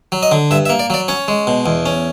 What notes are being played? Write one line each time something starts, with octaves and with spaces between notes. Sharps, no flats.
F#3
D#5
D3
G2 E5
E5
A#3
D5
F#3 D5
C#4 C#5
G#3
B2
E2
C#4